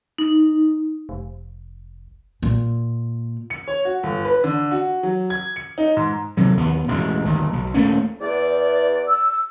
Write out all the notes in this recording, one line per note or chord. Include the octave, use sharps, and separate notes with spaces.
D#4
F1
A#2
C#7
C#5
F#4
G1
B4
D3
F#4
F#3
G#6
C#7
D#4
G#2
C3 F#3
D#2 B3
E1 A1 B2 G#3
G1 D#2
B1
D#1 A3 A#3 C#4
E2 D5
E6